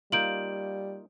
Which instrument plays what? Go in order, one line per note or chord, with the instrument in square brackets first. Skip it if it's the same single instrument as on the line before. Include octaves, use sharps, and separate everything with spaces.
[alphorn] G3 [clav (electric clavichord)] A#3 D#4 F4 [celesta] G6 D7 F#7